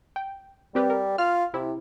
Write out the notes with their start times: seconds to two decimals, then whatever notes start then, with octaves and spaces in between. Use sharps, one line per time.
0.16 G5
0.75 G3 C4 G4 B4
0.90 A#4
1.18 F4 F6
1.54 C3 E4